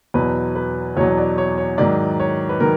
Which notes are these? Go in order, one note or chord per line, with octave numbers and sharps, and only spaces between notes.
E2 B2 F#3 B4
B4
E2 B2 F#3 C#5
D5
C#5
C#5
G#2 D#3 F#3 D5
C#5
B4
D#3 F#3 A#4